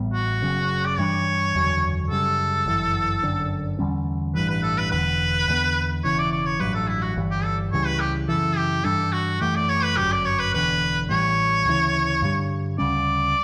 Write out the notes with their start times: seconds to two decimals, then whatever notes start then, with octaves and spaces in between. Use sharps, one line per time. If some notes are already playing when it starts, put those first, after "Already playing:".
Already playing: A1 A2 G3 B3
0.14 F#4
0.42 F#1 F#2 C#3
0.86 D5
0.98 G2 E3 G3 D4 C#5
1.55 F#1 E2 D3 F#3
2.10 F#2 C#3 G3 A4
2.66 G1 F#2 E3
3.22 G1 F#2 D3
3.79 E2 D3 G3 C#4
4.35 A1 G2 E3 B4
4.49 B4
4.63 A4
4.78 B4
4.91 E1 E2 D3 B4
5.48 E2 D3 G3 B3
6.04 E1 E2 C#3 E3 C#5
6.19 D5
6.32 D5
6.46 C#5
6.60 A1 G2 F#3 B4
6.75 A4
6.88 E4
7.02 F#4
7.16 G1 G2 E3 G3
7.31 G4
7.44 A4
7.72 C#2 C#3 E3 G3 C#5
7.86 B4
8.00 G4
8.29 F#2 C#3 E3 A4
8.57 G4
8.84 G2 E3 G3 D4 A4
9.13 F#4
9.41 F#2 E3 A3 G4
9.56 D5
9.69 C#5
9.84 B4
9.97 G1 F#2 D3 F#3 G4
10.12 D5
10.26 C#5
10.40 B4
10.54 E1 E2 D3 B4
11.09 A1 A2 E3 G3 C#5
11.66 D2 C#3 E3
12.22 G2 D3 G3
12.78 D2 C#3 G3 C#4 D5